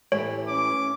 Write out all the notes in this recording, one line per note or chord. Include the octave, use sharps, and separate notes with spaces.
A2 E3 G4 C#5
C#4 D6